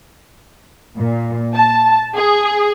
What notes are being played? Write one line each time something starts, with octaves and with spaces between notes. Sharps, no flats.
A#2
A5
G#4